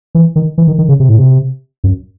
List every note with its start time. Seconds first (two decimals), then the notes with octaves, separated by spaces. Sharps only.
0.15 E3
0.36 D#3
0.58 E3
0.67 D#3
0.78 D#3
0.89 C#3
1.00 C3
1.09 A2
1.18 C3
1.84 F#2